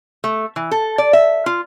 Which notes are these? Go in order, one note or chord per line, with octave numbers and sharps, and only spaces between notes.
A3
E3
A4
D5
E5
F4